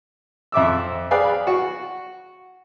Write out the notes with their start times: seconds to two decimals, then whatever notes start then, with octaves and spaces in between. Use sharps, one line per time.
0.52 F2 E5 D6 E6
1.11 G#4 B4 D5 F5 G5 G#5
1.47 F#4